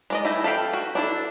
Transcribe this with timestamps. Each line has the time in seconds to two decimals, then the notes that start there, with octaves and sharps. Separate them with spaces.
0.10 G#3 D5 D#5
0.25 G3 A3 E4 G#5
0.44 A4 B4 F5 G5
0.73 F#4
0.95 D4 E4 A4